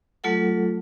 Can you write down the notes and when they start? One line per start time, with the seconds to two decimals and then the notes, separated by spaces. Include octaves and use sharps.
0.24 F#3 A3 F4 A4 F#5